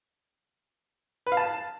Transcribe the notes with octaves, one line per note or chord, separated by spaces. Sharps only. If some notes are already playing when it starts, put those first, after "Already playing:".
B4
F5
A5